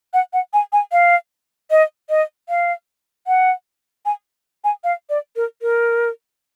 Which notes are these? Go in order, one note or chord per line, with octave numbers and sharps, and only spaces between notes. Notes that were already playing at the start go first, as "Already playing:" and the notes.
F#5
F#5
G#5
G#5
F5
D#5
D#5
F5
F#5
G#5
G#5
F5
D5
A#4
A#4